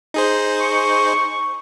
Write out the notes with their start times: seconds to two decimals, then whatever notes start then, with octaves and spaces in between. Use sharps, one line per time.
0.14 D#4 G#4 C5
0.60 C#6